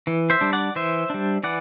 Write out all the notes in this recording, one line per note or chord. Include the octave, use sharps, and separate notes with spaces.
E3
C5 E5
G3 D4
D5 F#5
E3 C5 E5
G3 D4
E3 D5 F#5